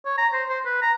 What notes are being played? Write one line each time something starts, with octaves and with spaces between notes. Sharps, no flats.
C#5
A#5
C5
C5
B4
A#5